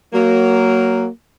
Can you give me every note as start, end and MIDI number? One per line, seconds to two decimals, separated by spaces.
0.13 1.06 54
0.13 1.06 58